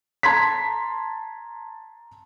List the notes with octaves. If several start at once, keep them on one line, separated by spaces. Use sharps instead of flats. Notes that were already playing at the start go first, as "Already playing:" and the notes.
A5 A#5 C6 G#6 B6